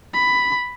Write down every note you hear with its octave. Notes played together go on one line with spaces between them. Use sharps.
B5